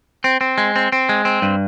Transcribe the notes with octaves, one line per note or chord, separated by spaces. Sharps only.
C4
C4
G#3
C4
C4
G#3
C4
G2